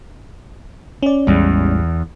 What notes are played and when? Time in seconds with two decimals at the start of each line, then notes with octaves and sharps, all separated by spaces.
1.03 C#4 D5
1.27 A1 E2 G3 G#3